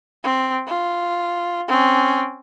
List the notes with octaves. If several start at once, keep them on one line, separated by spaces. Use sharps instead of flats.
C4
F4
C4 C#4